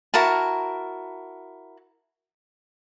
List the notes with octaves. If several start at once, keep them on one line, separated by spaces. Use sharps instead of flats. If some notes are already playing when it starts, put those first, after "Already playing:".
E4 F#4 A#4 A5